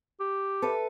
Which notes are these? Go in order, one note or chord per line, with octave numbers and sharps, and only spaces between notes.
G4
A4 B4 E5